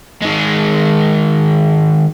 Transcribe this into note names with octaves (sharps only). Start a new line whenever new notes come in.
D#3 G#3